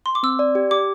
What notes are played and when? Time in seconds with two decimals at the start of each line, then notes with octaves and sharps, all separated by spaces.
0.06 C6
0.15 D6
0.23 C4 E6
0.39 D5
0.55 G4
0.71 G4 D6